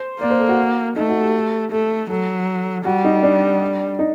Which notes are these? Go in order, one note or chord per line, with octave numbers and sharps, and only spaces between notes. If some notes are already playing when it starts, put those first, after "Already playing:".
Already playing: C5
A#3 D5
C5
A4
F#4
A3 D#4
F#4
G4
A3 A4
F#3 A4
G3 F#4
D#4
D4
D#4